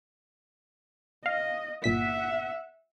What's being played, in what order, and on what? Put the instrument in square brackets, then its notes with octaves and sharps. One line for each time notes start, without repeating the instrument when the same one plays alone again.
[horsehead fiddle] D#5 [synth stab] F5
[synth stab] G1 A#2 B6 [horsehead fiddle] E5 F#5